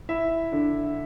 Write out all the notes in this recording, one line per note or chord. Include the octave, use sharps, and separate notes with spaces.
E4 E5
D3